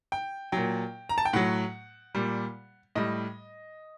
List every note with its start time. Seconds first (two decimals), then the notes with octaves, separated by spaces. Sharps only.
0.12 G5
0.52 A#2 F#3 G5
1.09 A#5
1.18 A5
1.25 G5
1.33 A2 F#3 F#5
2.15 A#2 G3
2.95 A2 G3 D#5